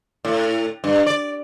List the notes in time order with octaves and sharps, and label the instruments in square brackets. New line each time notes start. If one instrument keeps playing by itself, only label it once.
[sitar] A2
G2
D5